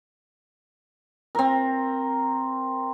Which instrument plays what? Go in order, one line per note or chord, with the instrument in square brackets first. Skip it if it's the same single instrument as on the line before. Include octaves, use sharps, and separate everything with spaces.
[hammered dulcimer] C4 A#4